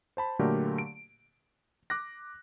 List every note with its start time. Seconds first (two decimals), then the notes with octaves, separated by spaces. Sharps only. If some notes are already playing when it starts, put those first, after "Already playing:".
0.17 C5 A5 B5
0.39 A#2 D3 F#3 A3 G4 A#4
0.78 D7
1.90 D6 F#6 A#6